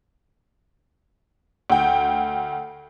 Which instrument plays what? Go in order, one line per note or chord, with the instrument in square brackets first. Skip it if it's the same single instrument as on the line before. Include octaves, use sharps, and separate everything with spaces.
[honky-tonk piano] D2 G5